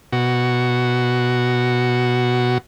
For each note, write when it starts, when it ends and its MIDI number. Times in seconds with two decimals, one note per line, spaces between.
0.12 2.58 47
0.12 2.58 66